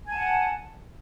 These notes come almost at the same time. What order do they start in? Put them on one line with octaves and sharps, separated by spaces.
G#5 A5 F#5